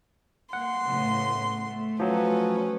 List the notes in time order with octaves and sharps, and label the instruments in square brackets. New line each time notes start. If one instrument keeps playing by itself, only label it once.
[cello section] A#3 [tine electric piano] F#5 [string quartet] C6
[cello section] A2 C#3 B3
A3
[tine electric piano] F3 F#3 [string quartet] C#4 B4